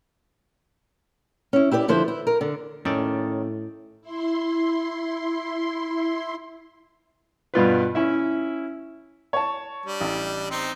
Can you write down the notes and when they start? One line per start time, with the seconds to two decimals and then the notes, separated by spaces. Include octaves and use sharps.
1.53 C#4 E4
1.71 E4 G4 B4 C#5 D5
1.88 D3 F3 E4 B4 C5
2.08 E4
2.27 A#4
2.41 D3
2.85 A2 D#3 C#4 A4 D5
4.01 E4 C6
7.54 G2 B2 F4 B4
7.95 C#4 E4 E5
9.33 C#5 A5
9.86 G3 D4
10.01 A1
10.51 C4 D#4 C5